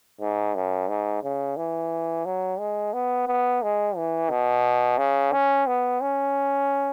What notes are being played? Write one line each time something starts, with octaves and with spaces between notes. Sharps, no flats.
G#2
F#2
G#2
C#3
E3
F#3
G#3
B3
B3
G#3
E3
B2
C#3
C#4
B3
C#4